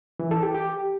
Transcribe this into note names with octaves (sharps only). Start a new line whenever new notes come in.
E3
A4
G4
G4